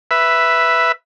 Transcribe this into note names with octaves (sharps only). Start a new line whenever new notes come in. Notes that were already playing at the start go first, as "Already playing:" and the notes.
B4 E5